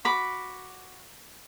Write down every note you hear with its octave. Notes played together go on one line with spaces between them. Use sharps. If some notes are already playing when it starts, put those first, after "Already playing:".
F#4 B5 D6